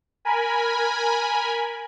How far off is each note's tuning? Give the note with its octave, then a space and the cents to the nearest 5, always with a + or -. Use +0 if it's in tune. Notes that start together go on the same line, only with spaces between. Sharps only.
A#4 +5 G#5 +0 B5 -10